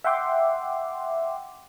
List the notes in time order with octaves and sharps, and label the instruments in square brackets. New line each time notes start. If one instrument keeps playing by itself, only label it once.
[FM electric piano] E5 F#5 G5 C6 D6